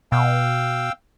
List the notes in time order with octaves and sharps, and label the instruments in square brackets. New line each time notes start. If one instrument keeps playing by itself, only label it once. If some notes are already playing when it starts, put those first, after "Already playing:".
[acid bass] B2 [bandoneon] F5 G5 E6